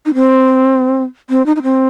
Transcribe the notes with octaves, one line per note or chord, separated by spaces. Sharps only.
D#4
C4
C4
D#4
D#4
C4